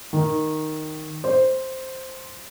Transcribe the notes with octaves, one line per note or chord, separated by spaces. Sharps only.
D#3
C5